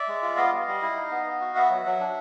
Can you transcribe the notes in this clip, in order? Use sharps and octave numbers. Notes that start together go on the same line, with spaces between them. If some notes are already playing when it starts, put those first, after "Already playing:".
Already playing: D5 E5
G#3
F4
B3 D#5 F5
G3
G3
E4
D#4
B3
B3
F#4
B3 E5 F#5
F#3
F#3
D4